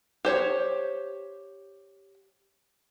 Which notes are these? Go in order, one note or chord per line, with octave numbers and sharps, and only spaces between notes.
G4 C5 C#5